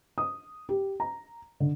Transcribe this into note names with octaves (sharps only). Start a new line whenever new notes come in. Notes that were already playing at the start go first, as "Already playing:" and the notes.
D#6
G4
A#5
D3